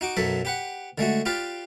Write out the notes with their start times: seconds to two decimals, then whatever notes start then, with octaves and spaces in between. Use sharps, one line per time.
0.01 D#4 F#4 D6
0.17 B1 F#2 F#3 A4 B5
0.45 G4 B4 F#5
0.98 D3 G#3 A3 F#4
1.26 F4 G4 B4 D5 F5